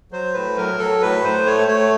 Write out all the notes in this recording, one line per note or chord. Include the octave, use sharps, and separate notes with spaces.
F#3 C5
A2 B4
F#3 A#4
F#3 A4
A2 B4
A2 C5
A3 C#5
A3 C#5